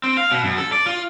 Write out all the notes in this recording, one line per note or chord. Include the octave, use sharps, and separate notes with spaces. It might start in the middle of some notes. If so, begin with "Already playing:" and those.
C4
F5
B2
F#2
A4
D5
F4